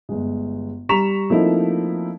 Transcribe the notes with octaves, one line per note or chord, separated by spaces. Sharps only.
G1 G#3
G3 A#5 C#6 B6 E7 F7
F3 A3 A#3 C4 D#4 E4